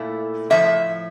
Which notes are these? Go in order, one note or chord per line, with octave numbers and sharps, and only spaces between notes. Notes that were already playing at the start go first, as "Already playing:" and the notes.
Already playing: A#2 A3 E4
A2 F3 A#3 E5